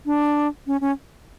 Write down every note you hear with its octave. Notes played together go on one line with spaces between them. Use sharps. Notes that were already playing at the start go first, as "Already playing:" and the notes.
D4
C#4
C#4